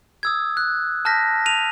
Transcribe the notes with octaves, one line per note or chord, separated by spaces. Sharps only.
D#6 E6 G#6
F#6
A5 F6 G6 A#6 B6
D#7 F7